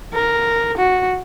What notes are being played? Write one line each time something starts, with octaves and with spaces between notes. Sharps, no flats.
A#4
F#4